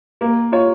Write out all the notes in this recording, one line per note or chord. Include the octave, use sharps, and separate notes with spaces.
A#3
F4 C#5